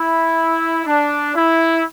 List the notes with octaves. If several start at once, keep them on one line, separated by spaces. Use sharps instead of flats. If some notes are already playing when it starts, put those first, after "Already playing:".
Already playing: E4
D4
E4